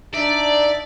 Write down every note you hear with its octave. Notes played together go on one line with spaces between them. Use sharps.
D4 D#4 D5 E5